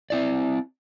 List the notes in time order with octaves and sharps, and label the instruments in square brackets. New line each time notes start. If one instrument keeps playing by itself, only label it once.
[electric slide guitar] C4 E4 D5